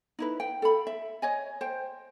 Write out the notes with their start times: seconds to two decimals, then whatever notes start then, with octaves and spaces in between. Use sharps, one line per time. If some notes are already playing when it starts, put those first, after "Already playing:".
0.19 D#4 E4 B4
0.40 G5
0.62 A4 F5 B5
0.87 E5
1.22 C#5 D#5 G#5
1.61 C5 G5